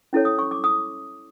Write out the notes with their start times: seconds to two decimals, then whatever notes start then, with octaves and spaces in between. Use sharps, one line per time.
0.13 C#4 E4 A4 C#5
0.25 D#6
0.39 C#6
0.51 D6
0.64 D#6